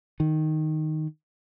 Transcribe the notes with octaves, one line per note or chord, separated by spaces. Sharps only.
D#3